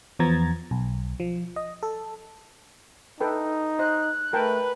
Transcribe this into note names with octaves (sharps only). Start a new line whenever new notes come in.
E2 F3 B3 A#5 G#6 A6
B1
F3
D#5
A4
D#4 A4 B4 G5
C5 D#5 F#6
A3 A#4 B4 G5 A5